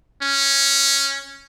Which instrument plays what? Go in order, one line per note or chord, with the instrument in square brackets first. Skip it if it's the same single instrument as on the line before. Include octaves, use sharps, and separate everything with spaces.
[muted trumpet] C#4